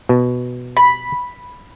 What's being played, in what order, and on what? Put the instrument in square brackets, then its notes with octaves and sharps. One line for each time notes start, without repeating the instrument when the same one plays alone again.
[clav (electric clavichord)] B2
[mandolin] B5